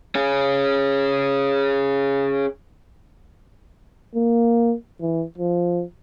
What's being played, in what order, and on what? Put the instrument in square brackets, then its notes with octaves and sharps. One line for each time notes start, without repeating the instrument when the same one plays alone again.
[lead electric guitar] C#4 G#4
[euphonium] A#3
E3
F3